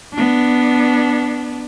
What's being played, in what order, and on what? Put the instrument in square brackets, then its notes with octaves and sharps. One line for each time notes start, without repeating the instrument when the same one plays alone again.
[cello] B3 D4